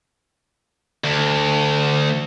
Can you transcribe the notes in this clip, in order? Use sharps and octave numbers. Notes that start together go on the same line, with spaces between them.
D2